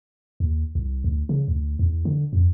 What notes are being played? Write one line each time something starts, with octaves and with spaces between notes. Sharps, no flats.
D#2
C2
D2
C#3
D2
E2
D3
F2